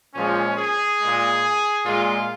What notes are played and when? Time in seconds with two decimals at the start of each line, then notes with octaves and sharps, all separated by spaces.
0.14 A#2 F3 G#3 C#4
0.57 G#4
1.01 A#2 G#3
1.86 A#2 G#3 F4